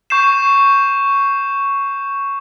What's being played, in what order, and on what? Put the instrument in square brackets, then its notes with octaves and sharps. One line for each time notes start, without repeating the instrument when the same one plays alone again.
[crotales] C#6 G6 C7 E7